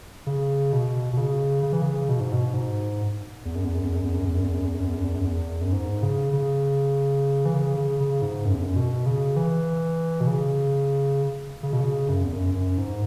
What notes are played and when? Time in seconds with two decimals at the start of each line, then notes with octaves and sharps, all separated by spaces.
0.26 C#3
0.73 B2
1.13 B2
1.17 C#3
1.63 C#3
1.73 E3
1.82 C#3
2.09 B2
2.20 G#2
2.32 B2
2.54 G#2
3.45 E2
3.55 F#2
3.65 E2
3.75 F#2
3.85 E2
3.95 F#2
4.05 E2
4.14 F#2
4.25 E2
4.34 F#2
4.44 E2
4.54 F#2
4.65 E2
4.74 F#2
4.85 E2
4.94 F#2
5.04 E2
5.15 F#2
5.25 E2
5.61 F#2
5.72 G#2
6.03 C#3
6.33 C#3
7.45 E3
7.54 C#3
7.77 C#3
8.00 C#3
8.22 G#2
8.45 F#2
8.54 E2
8.62 F#2
8.76 B2
9.06 C#3
9.36 E3
10.21 B2
10.27 C#3
11.63 C#3
11.73 B2
11.81 C#3
12.09 F#2
12.24 E2
12.32 F#2
12.55 F#2
12.78 G#2